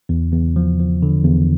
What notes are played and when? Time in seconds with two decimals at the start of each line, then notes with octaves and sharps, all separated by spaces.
0.09 E2
0.32 E2
0.56 F3
0.79 F3
1.03 D3
1.25 E2